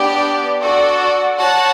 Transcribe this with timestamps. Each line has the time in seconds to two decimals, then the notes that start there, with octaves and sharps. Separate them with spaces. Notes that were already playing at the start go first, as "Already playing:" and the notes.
Already playing: B3 D4 G4 D5
0.61 F#4 A4 D5
1.37 F#4 C#5 F#5 A5